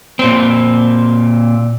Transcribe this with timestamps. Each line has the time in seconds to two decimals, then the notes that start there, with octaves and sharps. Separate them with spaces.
0.19 A#2 C4